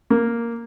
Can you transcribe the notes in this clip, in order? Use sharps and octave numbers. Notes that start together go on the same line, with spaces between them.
A#3